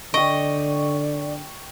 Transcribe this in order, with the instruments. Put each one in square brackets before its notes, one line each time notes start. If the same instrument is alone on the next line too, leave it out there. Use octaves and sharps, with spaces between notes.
[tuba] D3 [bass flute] D5 [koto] D#5 [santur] G5 C#6